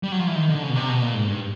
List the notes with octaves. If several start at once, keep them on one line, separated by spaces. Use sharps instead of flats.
G3
F#3
F3
E3
D#3
D3
C#3
B2
C3
B2
A#2
G#2
G2